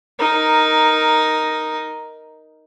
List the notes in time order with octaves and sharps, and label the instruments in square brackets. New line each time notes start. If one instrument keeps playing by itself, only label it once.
[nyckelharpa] D#4 A#4